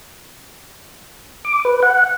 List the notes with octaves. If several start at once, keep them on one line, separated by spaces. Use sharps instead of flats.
D6
B4
F#5